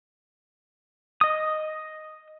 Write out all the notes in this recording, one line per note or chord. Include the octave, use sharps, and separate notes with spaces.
D#5 D#6